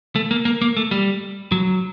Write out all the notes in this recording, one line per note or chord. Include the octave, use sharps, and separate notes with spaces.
A3
A#3
A#3
A#3
A3
G3
F#3